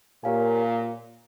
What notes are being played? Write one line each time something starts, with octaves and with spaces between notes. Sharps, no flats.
A#2 G4 A#4 C#5 F5 G#5